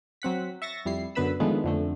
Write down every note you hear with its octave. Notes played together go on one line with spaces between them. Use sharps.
F#3 C4 F#5 B6
E5 C#6 A6 A#6
F2 G3 E4 C7
F#2 D3 B3 B4 B5 E6
D3 D#3 F3 G#3 A3 B3
F2 D3 A3